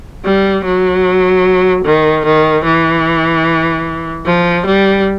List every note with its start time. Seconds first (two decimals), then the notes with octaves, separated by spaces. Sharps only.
0.25 G3
0.65 F#3
1.85 D#3
2.25 D#3
2.65 E3
4.26 F3
4.66 G3